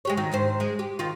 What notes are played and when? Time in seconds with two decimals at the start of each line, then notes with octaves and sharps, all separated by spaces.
0.05 G#3 G4 C#5
0.17 D#3 F#3 D#4
0.32 G#2 D#3 C5
0.60 G#3
0.79 G4
0.99 D#3 F4